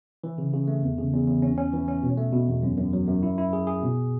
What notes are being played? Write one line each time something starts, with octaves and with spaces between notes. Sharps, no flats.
E3
C#3
C#3
A3
E2
C#3
E2
E2
C#4
C#4
E3
C#4
B2
A3
B2
E2
F#2
F#2
F#3
F#2
E4
E4
G#4
G#4
B2